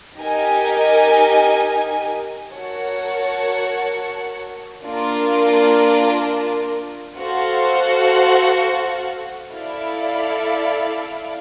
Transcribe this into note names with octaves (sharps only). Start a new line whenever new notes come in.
D#4 G4 A#4 D#5 G#5
F#4 A#4 C#5 F#5 A5
A#3 D4 F4 A#4
F#4 A4 C5 F5
E4 A4 D5 F5